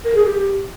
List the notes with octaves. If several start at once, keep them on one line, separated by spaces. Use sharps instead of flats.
A#4
G#4
G4